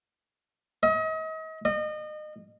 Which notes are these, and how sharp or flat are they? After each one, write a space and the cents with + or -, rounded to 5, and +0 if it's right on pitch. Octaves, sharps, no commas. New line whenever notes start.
D#5 +40
D#5 -30